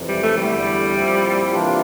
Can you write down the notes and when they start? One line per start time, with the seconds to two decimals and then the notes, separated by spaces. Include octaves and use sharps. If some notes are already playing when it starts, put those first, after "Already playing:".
Already playing: F2 C3 E3
0.09 G3
0.23 A3
0.37 E2 D3 G3 A3 E4 G4
0.94 A#2 F3 C4 E4 G4
1.52 C3 E3 A#3 D4 F4